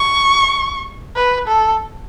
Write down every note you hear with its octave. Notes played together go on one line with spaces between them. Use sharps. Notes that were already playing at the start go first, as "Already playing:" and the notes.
Already playing: C#6
B4
A4